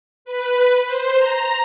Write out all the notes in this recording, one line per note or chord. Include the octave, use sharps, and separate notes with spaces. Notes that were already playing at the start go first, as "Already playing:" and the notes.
B4
C5
A#5